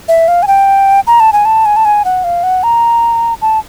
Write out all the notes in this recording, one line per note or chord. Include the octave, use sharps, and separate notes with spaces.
E5
F5
G#5
G5
A#5
A5
G#5
A5
G#5
A5
G#5
F#5
F5
F#5
A#5
A5